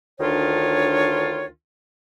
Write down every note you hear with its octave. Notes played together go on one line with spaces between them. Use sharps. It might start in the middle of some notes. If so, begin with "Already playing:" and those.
D2 D#3 D4 F4 C#5